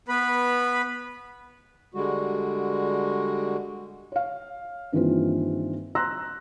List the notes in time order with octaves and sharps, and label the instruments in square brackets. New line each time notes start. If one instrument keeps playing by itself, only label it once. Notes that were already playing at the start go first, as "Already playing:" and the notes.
[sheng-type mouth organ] B3 B4 B5
[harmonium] D3 G3 G#3 F#4
[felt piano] C#5 F5
G2 D#3 E3 A#3 C4 F4
A#5 C6 E6 F#6 A#6